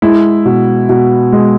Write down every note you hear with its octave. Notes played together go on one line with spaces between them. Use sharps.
G#3 E4
B2
B2
G#3